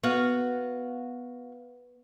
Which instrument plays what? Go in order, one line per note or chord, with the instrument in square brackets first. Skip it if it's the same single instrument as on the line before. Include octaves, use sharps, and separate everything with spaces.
[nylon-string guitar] B3 [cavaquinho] F#4 F5